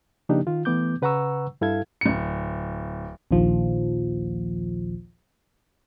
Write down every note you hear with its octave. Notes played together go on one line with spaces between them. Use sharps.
C#3 F3 A#3 D4 D#4 G4
D#3 F4
E3 A3 B3 D6 G6
C#3 B4 F#5 A#5 C#6 E6
G2 E4 A4 F5 G#6
D1 C#7
A#1 D#2 F3